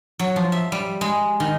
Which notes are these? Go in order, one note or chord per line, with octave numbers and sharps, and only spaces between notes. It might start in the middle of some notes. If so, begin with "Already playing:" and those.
F#3
F3
E5
G3
G#3
D#3